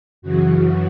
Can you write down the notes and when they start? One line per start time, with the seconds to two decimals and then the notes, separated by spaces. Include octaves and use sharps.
0.22 F#2 C#3 E3 F#4